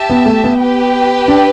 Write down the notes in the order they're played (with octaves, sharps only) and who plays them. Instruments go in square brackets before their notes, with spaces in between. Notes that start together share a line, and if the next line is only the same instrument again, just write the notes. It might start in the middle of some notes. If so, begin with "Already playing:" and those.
Already playing: [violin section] G4 E5 A5
[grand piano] B3
A3
B3
[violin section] G4 B4 G5
[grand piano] D4